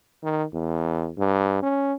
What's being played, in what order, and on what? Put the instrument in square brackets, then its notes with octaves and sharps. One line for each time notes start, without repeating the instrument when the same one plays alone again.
[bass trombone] D#3
E2
G2
C#4